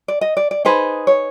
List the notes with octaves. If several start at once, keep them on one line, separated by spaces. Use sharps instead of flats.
D5
D#5
D5
D5
D#4 G#4 B4 C5
C#5